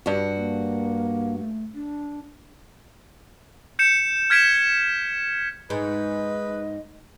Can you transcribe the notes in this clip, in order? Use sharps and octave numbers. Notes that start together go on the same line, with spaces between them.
G2 F#4
A#3
A3
D4
G6 C#7 E7
F6 G#6 B6 D7 E7
G#2 B4 D#5